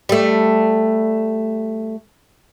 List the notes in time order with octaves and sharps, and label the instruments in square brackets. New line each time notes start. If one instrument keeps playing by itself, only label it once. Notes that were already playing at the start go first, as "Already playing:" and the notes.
[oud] G3 A3